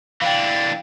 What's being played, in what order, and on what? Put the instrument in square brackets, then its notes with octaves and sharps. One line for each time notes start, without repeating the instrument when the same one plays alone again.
[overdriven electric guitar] E3 D4 [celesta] F5 G5